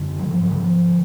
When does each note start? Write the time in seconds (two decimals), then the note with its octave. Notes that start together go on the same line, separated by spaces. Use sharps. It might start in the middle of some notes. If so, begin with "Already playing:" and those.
Already playing: F#2 D3
0.19 F#3
0.29 G#2 F3
0.43 F#3
0.51 D3
0.57 F3
0.89 D3